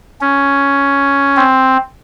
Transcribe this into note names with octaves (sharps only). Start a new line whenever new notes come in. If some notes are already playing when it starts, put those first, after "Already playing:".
C#4
C4